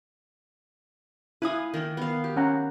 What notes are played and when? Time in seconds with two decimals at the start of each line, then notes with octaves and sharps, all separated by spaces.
1.42 E4 B4 F5 G#5 D#6
1.74 D#3 A#3 D#4
1.97 B3 F5
2.24 G4
2.36 C#4 F#5 A#5